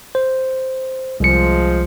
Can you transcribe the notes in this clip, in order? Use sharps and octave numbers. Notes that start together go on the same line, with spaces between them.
C5
C2 F3 G#3 C#7